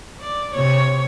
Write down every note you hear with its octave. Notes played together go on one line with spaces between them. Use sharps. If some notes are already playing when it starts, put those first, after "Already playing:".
D5
C3 C#5